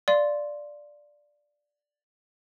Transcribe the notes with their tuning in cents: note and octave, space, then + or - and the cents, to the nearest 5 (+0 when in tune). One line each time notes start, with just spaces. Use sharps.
D5 +0 F5 +0 C6 +0